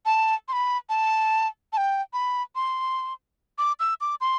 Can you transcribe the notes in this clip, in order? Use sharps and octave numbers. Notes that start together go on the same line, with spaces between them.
A5
C6
B5
A5
A5
G5
B5
C6
D6
E6
D6
C6